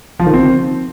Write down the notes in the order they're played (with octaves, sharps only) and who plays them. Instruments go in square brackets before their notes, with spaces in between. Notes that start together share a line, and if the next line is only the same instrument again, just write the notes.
[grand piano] F3
D#3
C4